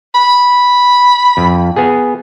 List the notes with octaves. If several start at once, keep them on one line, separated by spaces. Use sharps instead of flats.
B5
F2
B3 G#4